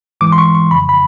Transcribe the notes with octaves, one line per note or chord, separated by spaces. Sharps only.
G#2 E3 G#3 D6
C6
C#6
C#6
F2 C#3 F3 B5
B5